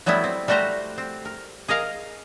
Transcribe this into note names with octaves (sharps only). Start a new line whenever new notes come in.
F#3 G3 A3 B3 E4
C4
G3 A3 F#4 G4 C5 A#5
C4
A#4
G#4 A#4 D#5 F5 A#5